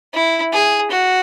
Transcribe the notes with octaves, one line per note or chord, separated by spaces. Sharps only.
E4
G#4
F#4